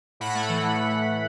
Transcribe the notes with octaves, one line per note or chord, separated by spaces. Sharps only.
A2 F#5 B5
A3
E3
A2